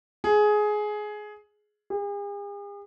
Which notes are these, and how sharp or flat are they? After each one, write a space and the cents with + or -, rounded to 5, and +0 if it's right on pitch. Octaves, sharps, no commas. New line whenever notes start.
G#4 +15
G#4 -45